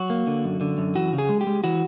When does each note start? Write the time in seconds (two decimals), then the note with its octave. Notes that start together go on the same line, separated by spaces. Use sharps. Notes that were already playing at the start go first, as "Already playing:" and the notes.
Already playing: F#3 F#4
0.10 A#3
0.27 D3
0.44 F#2
0.61 D3
0.78 F#2
0.95 E3 F#4
1.13 C#3
1.18 G#4
1.29 G#3
1.41 G4
1.47 G#3
1.64 E3 F#4